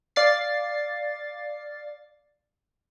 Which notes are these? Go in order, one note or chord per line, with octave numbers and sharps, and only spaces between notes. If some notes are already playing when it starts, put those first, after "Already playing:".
D5 F5 A6 C7